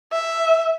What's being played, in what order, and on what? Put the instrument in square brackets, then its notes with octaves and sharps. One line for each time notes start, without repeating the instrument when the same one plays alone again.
[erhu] E5